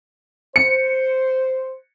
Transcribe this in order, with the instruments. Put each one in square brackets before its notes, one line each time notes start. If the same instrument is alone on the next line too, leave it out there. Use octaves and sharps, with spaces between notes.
[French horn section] C5 [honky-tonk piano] C#7